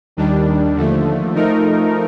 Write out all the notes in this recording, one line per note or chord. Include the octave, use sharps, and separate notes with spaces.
D#2 D#3 G3 D4
D#2 D3 F3 A3
F3 A3 D#4 A#4